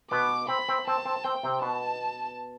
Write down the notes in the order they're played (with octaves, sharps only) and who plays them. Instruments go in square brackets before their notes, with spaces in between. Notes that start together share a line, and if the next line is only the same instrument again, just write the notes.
[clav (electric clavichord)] B2 B3 [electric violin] D6
[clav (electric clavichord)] C4 [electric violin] B5
[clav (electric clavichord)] C4
[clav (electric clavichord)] C4 [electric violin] A5
[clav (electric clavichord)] C4
[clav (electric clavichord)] C4 [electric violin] G5
[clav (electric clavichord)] C3 C4
[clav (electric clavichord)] B2 B3 [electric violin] A5